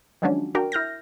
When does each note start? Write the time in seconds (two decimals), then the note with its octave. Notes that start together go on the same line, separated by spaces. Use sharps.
0.22 D#3 F3 F#3 G#3 C#4 D4
0.55 D4 F#4 A#4 G5
0.72 E4 F6 G6 A#6